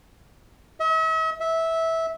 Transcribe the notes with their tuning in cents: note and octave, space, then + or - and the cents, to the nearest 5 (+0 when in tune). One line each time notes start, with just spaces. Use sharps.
E5 -45
E5 -15